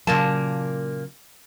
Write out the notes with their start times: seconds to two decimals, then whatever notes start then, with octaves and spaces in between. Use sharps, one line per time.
0.07 A#2 C#3 F#3 A#3 A5